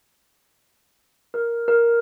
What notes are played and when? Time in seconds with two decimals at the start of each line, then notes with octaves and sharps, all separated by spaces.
1.34 A#4
1.68 A#4